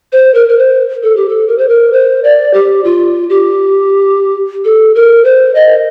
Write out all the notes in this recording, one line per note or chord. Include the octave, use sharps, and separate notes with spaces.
C5
A#4
A#4
C5
A4
G4
A4
A#4
C5
A#4
C5
D5
G4
F4
G4
A4
A#4
C5
D#5